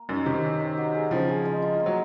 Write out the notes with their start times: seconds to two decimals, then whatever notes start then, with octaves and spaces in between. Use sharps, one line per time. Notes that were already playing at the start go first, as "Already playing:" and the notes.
Already playing: A#3 A#4
0.09 F#2 D#4
0.26 C3 D#3 C#5
0.43 C#4
0.60 D#5
0.77 F#3
0.95 G#4
1.11 C#3 F3 C4
1.29 G#4
1.45 G#3
1.62 F4
1.80 A#3
1.86 F#3